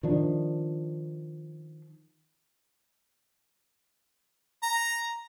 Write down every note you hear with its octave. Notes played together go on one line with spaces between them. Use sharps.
D#3 F3 D4
A#5